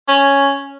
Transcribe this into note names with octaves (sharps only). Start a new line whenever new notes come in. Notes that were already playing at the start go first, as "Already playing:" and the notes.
C#4